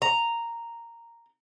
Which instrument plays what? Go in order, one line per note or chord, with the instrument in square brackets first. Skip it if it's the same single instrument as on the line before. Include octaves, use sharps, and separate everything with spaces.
[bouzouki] A#5